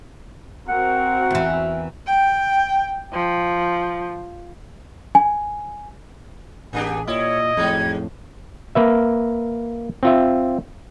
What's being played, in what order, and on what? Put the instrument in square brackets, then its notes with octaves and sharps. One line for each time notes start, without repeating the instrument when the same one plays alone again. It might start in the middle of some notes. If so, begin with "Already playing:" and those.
[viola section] C4 F#4 A#4 [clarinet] F#5
[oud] E2 E3
[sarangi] G5
F3
[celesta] G#5
[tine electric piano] A1 G#4 [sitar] A#3 D4 G4 [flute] G#5
[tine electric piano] A#2 [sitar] E4 [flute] C#5 [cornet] D#5
[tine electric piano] F2 A2 [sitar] F#3 G#3 D#4 [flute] G#6
[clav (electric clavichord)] A#3 B4 E5
C4 F4 E5